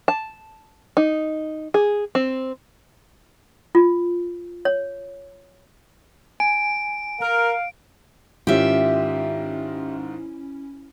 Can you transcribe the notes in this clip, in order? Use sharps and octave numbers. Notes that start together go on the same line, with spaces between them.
A5
D#4
G#4
C4
F4
C#5
G#5 D7
A#4 F5
G#2 D#3 C#4 E4 F4 G4 E5